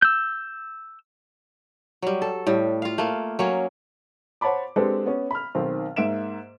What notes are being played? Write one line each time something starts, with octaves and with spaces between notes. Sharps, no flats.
E6 G6
F#3 G3
A4
A2 G3
F4 F5
A3 A#3
F#3 A#3 C#4
C5 C#5 F#5 A5 B5 D6
G#3 C4 D4 G4 A4 B4
B3 C#4
B5 F6
B1 D#3 C4
G#2 A#3 E5 D7 E7